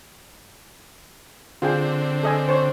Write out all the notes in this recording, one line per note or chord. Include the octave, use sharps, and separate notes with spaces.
D3 C4 F4 G#4 G5
A4 D#5 G#5
C5 C#5